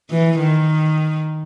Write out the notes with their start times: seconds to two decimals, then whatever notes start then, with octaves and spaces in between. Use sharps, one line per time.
0.11 E3
0.39 D#3